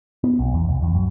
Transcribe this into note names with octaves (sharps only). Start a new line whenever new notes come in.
B3
B1
E2
C2
E2
F#2